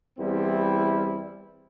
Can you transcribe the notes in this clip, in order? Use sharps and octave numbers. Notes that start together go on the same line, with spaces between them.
E2 G3 C4 E4